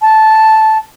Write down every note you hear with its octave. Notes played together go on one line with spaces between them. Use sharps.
A5